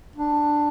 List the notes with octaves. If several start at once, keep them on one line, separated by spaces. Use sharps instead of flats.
D4